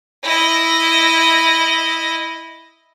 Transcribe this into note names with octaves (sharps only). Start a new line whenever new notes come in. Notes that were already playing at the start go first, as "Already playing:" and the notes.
E4 D#5